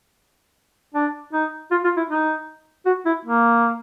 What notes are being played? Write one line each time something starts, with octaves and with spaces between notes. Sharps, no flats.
D4
D#4
F4
F4
E4
D#4
F#4
E4
A#3